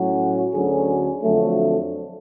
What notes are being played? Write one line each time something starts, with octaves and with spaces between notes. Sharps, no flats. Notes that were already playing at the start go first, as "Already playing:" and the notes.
Already playing: A2 F#3 C#4 F#4
D2 D3 F#3 C#4 G#4
F2 D3 F#3 A3